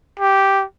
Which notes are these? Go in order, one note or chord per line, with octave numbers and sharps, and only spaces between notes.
G4